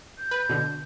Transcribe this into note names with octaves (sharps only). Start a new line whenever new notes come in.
G6
B4
B2 D3